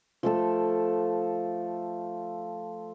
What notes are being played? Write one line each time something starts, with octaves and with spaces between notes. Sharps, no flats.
F3 A3 A4